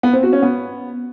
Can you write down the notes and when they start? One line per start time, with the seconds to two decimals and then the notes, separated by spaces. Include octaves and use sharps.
0.03 B3
0.13 C4
0.23 F#4
0.33 C#4
0.42 B3